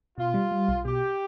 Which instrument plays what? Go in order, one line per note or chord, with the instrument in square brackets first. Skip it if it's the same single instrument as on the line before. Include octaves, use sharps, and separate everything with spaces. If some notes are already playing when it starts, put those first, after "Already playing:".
[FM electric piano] B2 [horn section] F4
[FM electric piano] G3
G3
B1
[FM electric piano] B2 [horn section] G4